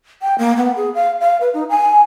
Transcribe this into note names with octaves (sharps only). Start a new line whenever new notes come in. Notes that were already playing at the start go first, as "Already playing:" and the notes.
G5
A#3
B3
G#4
F5
F5
B4
D#4
G#5